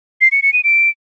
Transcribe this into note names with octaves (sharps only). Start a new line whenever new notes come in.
C7
C#7
C#7
D#7
D7